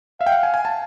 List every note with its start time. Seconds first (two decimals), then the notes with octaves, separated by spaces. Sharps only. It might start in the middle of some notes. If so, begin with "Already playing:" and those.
0.20 E5 F5
0.27 G5
0.32 F#5
0.43 G#5
0.54 G#5
0.65 A5